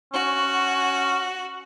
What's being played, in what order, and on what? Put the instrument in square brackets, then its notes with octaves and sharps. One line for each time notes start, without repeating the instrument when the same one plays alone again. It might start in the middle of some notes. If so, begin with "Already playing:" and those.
[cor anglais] C#4 [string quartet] F#4